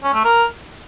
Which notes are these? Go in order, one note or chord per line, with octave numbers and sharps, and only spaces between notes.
C#4
A3
A#4